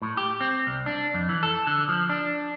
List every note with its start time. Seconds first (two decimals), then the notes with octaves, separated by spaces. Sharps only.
0.02 A2
0.17 G4
0.41 C4
0.67 C2
0.86 D4
1.14 F2
1.29 E3
1.43 A4
1.67 D3
1.89 F3
2.09 D4